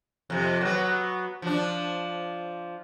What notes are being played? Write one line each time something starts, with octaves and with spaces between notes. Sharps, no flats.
F2 C3
F#3 B3
F3 D4